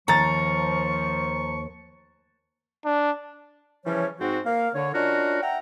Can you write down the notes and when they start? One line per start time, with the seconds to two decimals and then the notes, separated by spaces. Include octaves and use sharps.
0.08 D#2 F3 A#5 C#6 A6
2.85 D4
3.86 C#3 E3 F3 G3 C#4 C#5
4.20 G#2 C4 F#4
4.45 A#3 F5
4.75 D3 C#5
4.94 C#4 D4 F4 F#4 A#4 D#5
5.42 E5 F#5 G5 A#5